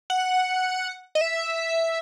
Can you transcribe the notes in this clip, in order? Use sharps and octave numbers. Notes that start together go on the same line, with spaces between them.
F#5
D#5
E5